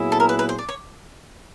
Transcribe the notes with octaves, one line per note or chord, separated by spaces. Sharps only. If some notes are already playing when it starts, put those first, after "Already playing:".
Already playing: A#2 F#3 B3 E4 G#4
A4
A#4
B4
B4
C5
D5
C#5